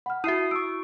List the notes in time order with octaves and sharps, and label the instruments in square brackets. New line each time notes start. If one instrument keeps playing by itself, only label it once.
[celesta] F#5 F6 [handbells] B5
[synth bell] E4 F#4 [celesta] E5 D#7 [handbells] D#6 C7
[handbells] C#6 D7 [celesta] E6